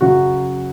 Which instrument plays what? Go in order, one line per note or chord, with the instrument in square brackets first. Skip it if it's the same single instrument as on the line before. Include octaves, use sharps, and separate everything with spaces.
[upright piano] F#2 C#3 F#3 F#4